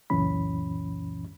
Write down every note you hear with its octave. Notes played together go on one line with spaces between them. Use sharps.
C#2 F#2 A#2 E3 C#4 B5